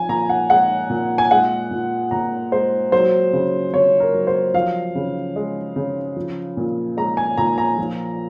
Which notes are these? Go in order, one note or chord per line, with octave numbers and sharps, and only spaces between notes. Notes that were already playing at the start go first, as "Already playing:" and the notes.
Already playing: F3 G#5
A#2 A#5
F#5
G#3 F#5
A#2
G#5
G#3 F#5
A#2
A#2 A#5
G#3 C5
F#3 C5
C#3
C#3 C#5
A#4
F#3
C5
F3 F5
C#3
G#3
C#3
F3
A#2
G#3 A#5
G#5
A#2 A#5
A#5
F3